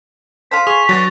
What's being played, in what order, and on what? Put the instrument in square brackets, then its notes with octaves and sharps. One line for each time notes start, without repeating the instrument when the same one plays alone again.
[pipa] F4 A4 C5 [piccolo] B6
[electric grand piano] G#4 [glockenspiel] C#6 F7
[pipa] D3 E3 [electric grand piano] F#3 A6